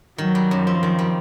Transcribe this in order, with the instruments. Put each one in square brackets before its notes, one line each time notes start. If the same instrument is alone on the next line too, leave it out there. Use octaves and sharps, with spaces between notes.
[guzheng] D#3 [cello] F#3
[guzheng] G3
F#2
[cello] F3 [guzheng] C4
[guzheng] D#3
G3